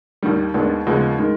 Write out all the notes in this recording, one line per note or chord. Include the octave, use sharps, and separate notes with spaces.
D#2 D#3 G3
D#2 D#3 G#3 B3 D4
D#2 C#3 F3 G#3 B3
D#3 G#3